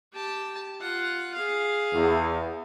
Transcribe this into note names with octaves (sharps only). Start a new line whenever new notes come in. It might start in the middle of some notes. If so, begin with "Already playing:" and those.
G4 A5
F4 F#5
G#4 F5
E2